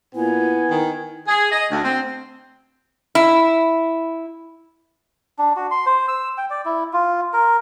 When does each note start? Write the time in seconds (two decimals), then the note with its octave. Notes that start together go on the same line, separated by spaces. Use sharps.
0.15 A#2 B3 E4 G#5
0.70 D#3
1.27 G#4
1.50 D#5
1.71 D2
1.82 C4
3.15 E4
5.39 D4
5.56 F#4
5.71 C6
5.86 C5
6.08 E6
6.38 G5
6.50 D5
6.65 E4
6.93 F4
7.33 A#4